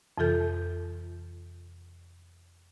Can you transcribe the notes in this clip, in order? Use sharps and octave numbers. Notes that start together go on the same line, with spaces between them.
F2 C3 E3 F4 A4 G6